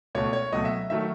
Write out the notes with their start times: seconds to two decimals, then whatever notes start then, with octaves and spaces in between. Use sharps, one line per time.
0.15 C#2 B2 A3 C#5
0.33 C#5
0.52 C#2 B2 F#3 A3 D#5
0.65 E5
0.90 D#3 F#3 A3 E5